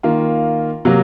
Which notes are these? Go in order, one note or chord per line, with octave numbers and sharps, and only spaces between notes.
D#3 A#3 F4
C3 F#3 A#3